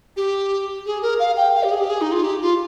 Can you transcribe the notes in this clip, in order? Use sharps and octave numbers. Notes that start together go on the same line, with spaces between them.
G4
G#4
A#4
F5
G5
F5
G4
G#4
G4
G#4
D#4
F4
G4
F4